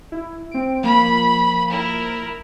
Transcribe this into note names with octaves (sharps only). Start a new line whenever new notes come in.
E4
C4 D7
F3 A#3 B5
E4 A#4